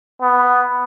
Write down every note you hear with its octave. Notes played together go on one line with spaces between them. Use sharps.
B3